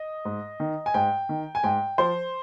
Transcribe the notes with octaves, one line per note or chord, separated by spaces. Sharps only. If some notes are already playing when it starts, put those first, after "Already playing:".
Already playing: D#5
G#2
D#3
G#5
G#2 G5
D#3
G#5
G#2 G5
F3 C5